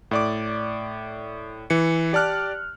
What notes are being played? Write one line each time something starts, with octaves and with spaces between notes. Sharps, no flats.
A2 D5 D6
E3 C#7
G4 D5 A5 F6 F#6